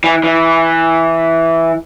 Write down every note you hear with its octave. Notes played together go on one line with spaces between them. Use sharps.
E3
E3